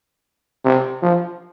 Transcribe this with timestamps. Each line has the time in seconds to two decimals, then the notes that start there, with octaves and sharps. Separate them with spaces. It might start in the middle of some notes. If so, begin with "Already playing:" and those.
0.65 C3
1.02 F3